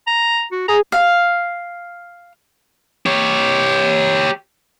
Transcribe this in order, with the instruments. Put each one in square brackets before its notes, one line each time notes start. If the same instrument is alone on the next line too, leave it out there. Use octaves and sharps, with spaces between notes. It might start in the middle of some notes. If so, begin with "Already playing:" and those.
[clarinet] A#5
F#4
[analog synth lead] G#4 [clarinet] A#5
[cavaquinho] F5
[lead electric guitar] G4 C#5